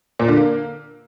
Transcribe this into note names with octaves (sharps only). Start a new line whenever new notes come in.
A#2
D3
A#3